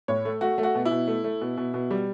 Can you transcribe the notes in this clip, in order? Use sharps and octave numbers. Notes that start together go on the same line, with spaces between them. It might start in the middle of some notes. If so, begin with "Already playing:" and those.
A2 C#5
A3
A3 F#4
A3
F#4
B2
E4
B2
A3
A3
B2
B2
B2
G3